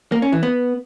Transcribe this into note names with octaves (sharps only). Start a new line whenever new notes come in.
A#3
C#4
E3
B3